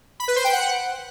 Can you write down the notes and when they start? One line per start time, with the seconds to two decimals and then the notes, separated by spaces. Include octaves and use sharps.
0.20 B5
0.28 B4
0.36 C5
0.44 G5
0.52 F#5